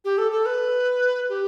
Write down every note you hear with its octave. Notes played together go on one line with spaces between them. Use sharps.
G4
A4
A4
B4
G4